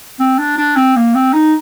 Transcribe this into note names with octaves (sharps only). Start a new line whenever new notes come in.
C4
D4
D4
C4
A#3
C4
D#4